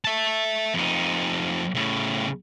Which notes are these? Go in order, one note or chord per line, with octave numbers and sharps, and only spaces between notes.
E5 A5
F2 D#4
A2 C#3